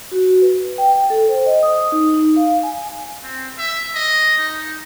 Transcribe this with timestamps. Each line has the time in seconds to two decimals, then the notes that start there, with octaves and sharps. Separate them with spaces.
0.12 F#4
0.42 B4
0.78 G5
1.10 A4
1.29 C5
1.46 D#5
1.63 D#6
1.92 D#4
2.14 D#4
2.36 F5
2.63 G#5
3.23 C4
3.58 E5
3.94 D#5
4.38 D#4